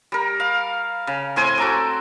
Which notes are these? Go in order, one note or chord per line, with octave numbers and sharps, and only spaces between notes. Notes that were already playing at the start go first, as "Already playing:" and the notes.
G3 A#4
F5
C#3
A2 C4 G#5 C6
F#4 A4 A#5 D6